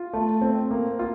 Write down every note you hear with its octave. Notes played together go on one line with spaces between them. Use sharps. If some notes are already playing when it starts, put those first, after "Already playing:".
Already playing: F4
A3
C4
A#3
F4